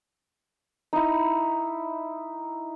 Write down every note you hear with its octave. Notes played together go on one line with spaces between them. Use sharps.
D#4 E4